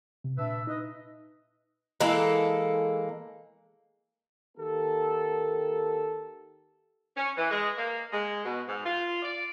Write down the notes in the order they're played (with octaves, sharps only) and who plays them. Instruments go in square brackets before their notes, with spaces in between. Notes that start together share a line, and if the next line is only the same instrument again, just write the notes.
[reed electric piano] C3
[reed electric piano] A#2 [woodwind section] D4 B4 E5
[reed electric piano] D#4 [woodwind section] B4 D#5
[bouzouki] E3 G#3 A#3 A4
[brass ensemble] D#3 A#3 G4 A4
[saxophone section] C#4
E3
G#3
A#3
G#3
B2
G#2
F4
D5